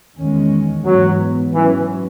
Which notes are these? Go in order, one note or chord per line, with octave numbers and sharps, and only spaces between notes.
E2 D#3 G#3 C#4
G#2 E3 F#3 B3
G#2 E3 F#3 C#4